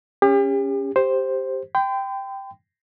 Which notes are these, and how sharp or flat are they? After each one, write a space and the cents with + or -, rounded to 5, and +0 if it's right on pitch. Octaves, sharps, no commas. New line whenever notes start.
C#4 +0 G4 +40
G4 +0 C5 +5
G5 +0 C6 -45